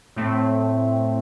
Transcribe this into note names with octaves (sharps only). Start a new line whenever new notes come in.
A2 A3 C4